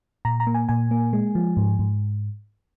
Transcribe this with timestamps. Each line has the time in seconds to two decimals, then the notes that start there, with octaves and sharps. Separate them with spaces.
0.25 A#2 A#5
0.40 A#5
0.47 A#3
0.54 G#5
0.69 A#2 G#5
0.91 A#3
1.13 G#3
1.35 F3
1.57 G#2
1.79 G#2